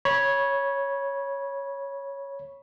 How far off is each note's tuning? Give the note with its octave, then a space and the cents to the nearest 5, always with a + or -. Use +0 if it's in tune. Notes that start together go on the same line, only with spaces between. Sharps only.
C#5 +0 B5 -25